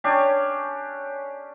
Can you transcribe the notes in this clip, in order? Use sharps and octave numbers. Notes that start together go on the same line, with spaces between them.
C#4 D4 G4 C#5